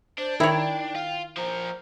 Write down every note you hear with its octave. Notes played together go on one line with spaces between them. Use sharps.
D4 C5
D#3 E4 C#5 G5
F4
F3 A#4 C5